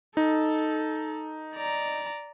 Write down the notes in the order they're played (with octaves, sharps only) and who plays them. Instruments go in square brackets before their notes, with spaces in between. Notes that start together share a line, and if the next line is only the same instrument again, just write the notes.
[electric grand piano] D#4 [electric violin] A4
[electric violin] D5 A#5